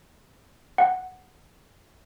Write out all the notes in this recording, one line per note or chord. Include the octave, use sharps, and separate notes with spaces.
F#5